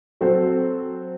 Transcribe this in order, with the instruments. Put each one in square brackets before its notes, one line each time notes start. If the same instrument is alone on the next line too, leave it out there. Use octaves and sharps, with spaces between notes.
[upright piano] F#3 C4 F#4 A4 C5